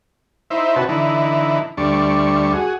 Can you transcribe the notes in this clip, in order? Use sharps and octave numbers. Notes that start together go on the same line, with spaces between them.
D#4 E4 C5 E5
C3 F#4 B4 C#5 A5
D3 E3 D#4 E4
D2 G3 D4 C#6
F#4 G#4